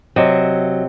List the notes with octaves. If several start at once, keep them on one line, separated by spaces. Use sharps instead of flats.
C3 F#3 D#5 E5